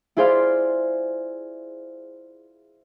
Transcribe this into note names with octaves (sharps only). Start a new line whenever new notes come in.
E4 F4 G#4 C5 D5 F5